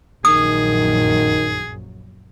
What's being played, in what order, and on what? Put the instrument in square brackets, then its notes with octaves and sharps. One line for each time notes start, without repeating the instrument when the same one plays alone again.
[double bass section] A#1 F#2 F#3 [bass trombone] D#3 [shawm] G#4 [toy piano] D#6